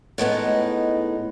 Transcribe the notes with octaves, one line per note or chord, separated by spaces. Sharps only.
A2 G#3 B3 D#4